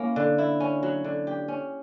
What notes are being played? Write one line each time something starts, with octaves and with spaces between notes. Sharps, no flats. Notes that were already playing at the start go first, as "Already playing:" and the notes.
Already playing: A#3 C#4 E4
D3
E4
C#4
F#3
D3
G4
C#4